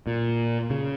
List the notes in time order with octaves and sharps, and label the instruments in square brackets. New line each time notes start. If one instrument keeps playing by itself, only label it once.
[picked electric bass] A#2
C#3